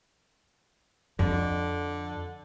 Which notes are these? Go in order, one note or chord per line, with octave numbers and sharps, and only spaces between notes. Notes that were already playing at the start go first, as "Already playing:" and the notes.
F2 D3